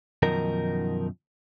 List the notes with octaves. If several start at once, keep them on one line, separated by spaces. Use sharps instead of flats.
F#2 B2 D#3 F3 D#4 A#4